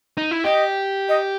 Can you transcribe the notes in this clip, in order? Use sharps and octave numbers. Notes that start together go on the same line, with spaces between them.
D#4
E4
G4 D#5
D#5